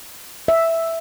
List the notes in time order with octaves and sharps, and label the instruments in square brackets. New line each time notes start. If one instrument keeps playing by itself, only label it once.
[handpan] E5